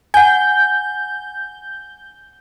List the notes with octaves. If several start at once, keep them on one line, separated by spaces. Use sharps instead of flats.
F#5 G#5 G6